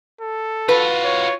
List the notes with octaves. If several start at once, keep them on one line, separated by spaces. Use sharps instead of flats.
A4
F4 F#4 B4
C#5